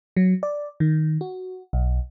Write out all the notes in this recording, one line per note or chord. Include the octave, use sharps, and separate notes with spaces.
F#3
D5
D#3
F#4
B1